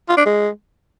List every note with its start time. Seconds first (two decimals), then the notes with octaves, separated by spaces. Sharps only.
0.09 F4
0.17 D4
0.26 G#3